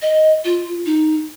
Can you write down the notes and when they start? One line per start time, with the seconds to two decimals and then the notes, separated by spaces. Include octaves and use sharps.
0.02 D#5
0.44 F4
0.86 D#4